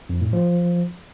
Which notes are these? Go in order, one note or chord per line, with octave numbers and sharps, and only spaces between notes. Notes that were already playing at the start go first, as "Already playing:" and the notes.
F2
A2
F3